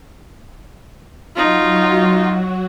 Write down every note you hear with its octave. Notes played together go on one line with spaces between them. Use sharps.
F#3 D#4 F4 F#4